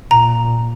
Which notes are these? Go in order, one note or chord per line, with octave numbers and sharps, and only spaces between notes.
A#2 A#5